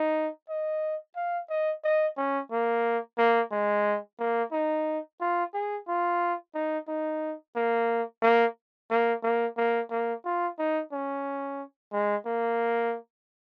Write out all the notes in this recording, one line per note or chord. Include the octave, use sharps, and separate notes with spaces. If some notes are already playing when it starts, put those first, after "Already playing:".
Already playing: D#4
D#5
F5
D#5
D#5
C#4
A#3
A#3
G#3
A#3
D#4
F4
G#4
F4
D#4
D#4
A#3
A#3
A#3
A#3
A#3
A#3
F4
D#4
C#4
G#3
A#3